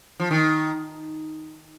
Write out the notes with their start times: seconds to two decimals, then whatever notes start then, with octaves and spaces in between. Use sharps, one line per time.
0.20 F3
0.31 D#3